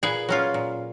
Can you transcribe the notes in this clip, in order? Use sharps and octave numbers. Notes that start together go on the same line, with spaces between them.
A#2 G#4 B4
F#3 C#4 F4
A#2